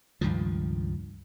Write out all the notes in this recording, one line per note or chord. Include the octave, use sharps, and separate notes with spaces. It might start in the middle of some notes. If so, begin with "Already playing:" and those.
C#2 G2 D#3 F3